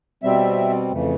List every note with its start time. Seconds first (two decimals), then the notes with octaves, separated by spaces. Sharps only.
0.23 B2 G3 C4 E5
0.91 F2 C#3 E3 A3